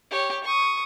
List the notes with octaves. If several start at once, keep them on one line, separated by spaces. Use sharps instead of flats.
G4 C#5
C#6 D#6